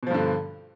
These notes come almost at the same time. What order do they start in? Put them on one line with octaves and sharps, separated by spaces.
B2 F3 G2 D3